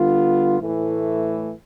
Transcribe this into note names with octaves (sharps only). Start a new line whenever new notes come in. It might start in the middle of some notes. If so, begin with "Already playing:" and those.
Already playing: D3 G3 B3 F4
A2 E3 A3